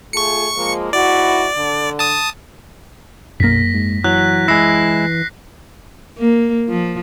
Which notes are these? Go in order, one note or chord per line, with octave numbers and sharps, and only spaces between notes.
A3 F4 G#4 C#6 C#7
F3 G#3 A#3
G#2 E4 F#4 D5
D3
A5 D#6
B1 F#2 A#3 A#6 B6
G#2
E3 F#3 F#6
G#3 E4 A#6 C7
A#3
F3